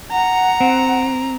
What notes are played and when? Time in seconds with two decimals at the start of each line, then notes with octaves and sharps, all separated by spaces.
0.11 F#5 A#5
0.60 C4